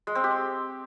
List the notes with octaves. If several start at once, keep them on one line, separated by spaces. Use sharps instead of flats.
G#3
C4
G4